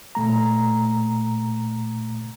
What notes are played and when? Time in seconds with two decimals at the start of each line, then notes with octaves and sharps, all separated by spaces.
0.15 A#2 A3 A#5